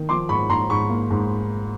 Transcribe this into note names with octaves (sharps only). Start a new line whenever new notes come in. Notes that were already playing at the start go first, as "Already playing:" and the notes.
Already playing: D#3
F3 C6 D6
G#2 B5 C#6
G#2 A#5 C6
G#2 B5 C#6
A#3
G#2